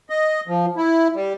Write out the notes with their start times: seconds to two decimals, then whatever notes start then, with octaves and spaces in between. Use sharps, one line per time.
0.10 D#5
0.48 F3
0.77 E4
1.15 G3